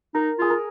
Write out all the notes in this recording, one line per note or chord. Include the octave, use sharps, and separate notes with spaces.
D#4 A#4
F4 G#4
A#4